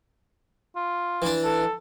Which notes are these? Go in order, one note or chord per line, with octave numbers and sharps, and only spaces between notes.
F4
E3 D4
A4